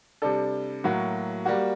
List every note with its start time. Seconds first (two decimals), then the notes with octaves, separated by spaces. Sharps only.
0.22 C3 G3 D4 A4
0.84 A2 F#3 A#3 F#4
1.45 G3 A#3 F#4